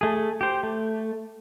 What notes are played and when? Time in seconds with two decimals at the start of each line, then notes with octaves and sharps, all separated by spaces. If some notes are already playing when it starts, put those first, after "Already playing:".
0.01 A3 G#4
0.41 G4 C5
0.63 A3